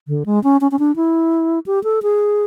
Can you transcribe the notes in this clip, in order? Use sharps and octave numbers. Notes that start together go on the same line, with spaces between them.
D3
G#3
C#4
C#4
C#4
D4
E4
G4
A4
G#4